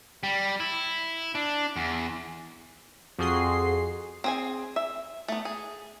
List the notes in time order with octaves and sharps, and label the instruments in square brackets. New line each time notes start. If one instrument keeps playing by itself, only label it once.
[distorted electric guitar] G3
E4
D4
E2
[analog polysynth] F2 F#4 G#4 C6 C7
[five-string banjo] C4 G#4 G#5
E5
A3 B3
G#4